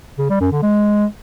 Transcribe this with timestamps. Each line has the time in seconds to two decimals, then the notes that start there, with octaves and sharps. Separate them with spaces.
0.19 C#3
0.30 G3
0.41 F#2
0.52 D3
0.63 G#3